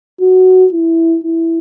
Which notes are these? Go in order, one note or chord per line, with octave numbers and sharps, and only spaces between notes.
F#4
E4
E4